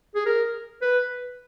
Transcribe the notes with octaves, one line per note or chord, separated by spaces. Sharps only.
G#4
A#4
B4